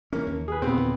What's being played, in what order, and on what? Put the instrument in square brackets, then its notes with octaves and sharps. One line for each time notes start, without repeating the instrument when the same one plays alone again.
[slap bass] E3 C#4 [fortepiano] A#3
[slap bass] D#2
[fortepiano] G#4 B4
[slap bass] A#2 [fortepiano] B3 C4
[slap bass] D#2 A#2 D3